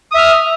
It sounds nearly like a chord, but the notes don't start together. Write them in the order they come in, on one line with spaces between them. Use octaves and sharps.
D#6 E5 F6